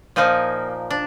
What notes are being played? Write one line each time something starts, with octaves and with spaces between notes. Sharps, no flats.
A#2 F3 A#3 D#4
D4